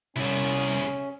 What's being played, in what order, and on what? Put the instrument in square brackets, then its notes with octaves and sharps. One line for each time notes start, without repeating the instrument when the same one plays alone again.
[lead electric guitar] C2 [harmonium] C#4 [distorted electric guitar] E4 G#4